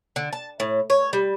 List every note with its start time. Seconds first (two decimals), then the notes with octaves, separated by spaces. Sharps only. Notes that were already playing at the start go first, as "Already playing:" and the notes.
0.16 D3
0.33 A5
0.60 A2
0.90 C#5
1.13 G3